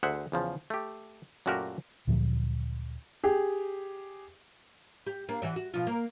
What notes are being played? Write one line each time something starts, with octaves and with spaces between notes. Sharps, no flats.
D2 G#4 C5 E5 F#5
E2 C#3 F3
A3 G4
F#2 A#2 A3 F#4 G4 A#4
D2 A#2 F3 F#3
G4 G#4
G4
A#3 D4
E3 F#4 D5
F#4
B2 F3 F4
A#3